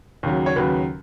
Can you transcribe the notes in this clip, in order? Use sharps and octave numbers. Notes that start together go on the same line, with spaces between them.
D#2 C#3 F#3
C#5
D#2 C#3 F#3 F#4 B4